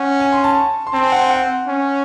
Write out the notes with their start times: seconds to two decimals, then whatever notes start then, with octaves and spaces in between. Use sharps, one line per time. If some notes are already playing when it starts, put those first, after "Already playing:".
Already playing: C#4 F#5
0.20 G#5
0.33 C6
0.44 A5
0.87 C6
0.93 C4 A5
1.03 G#5
1.12 F#5
1.21 G#5
1.30 F#5
1.67 C#4